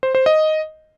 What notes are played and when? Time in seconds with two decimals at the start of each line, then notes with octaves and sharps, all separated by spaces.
0.03 C5
0.15 C5
0.26 D#5